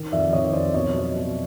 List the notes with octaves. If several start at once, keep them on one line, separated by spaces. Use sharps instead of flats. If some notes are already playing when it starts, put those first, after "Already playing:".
Already playing: D#3
F2 D5 E5
D#3 C#5 D#5
F2 C5 D5
B2 C#5 D#5
F#3
B2